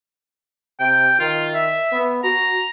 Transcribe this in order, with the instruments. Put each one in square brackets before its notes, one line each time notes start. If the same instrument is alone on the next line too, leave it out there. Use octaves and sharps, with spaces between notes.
[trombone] C3 [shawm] G5
[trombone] D#3 [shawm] F4
[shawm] E5
[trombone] B3
[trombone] F#4 [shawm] A#5